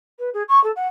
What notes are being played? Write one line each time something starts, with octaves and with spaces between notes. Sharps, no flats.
B4
G#4
C#6
A4
F#5